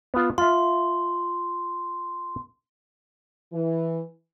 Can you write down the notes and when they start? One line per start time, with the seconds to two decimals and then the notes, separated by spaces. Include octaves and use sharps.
0.14 B3 F4
0.38 F4 E5 C6
3.53 E3